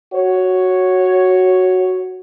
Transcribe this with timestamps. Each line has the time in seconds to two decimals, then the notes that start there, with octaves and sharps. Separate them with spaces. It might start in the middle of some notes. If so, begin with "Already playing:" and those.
0.14 F#4 C#5